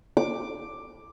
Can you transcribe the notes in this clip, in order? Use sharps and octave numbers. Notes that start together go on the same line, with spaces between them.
D6